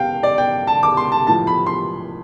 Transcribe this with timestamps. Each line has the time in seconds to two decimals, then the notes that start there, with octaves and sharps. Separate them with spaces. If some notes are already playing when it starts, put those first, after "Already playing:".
Already playing: F5 G5
0.23 D5
0.38 G5
0.67 A5
0.83 D6
0.97 C6
1.12 A5
1.27 A2 F3 A5
1.47 B5
1.66 C6